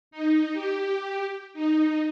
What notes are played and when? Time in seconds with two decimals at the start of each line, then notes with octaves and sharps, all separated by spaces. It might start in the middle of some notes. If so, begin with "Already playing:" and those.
0.11 D#4
0.53 G4
1.54 D#4